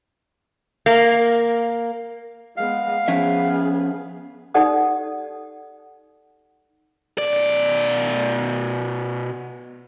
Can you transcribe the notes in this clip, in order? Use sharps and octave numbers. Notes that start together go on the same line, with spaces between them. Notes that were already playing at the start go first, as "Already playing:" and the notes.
A#3
G#3 B3 F5
F3 B3 C#4 G#4 E5
D#4 G4 A4 D5 F#5 D#6
B2 D5